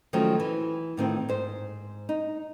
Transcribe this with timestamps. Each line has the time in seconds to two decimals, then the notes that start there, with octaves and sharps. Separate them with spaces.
0.13 D#3 F3 F#3 A3 C#4
0.40 E3
0.97 A2 D#3 C4 F4
1.29 G#2 C5
2.09 D#4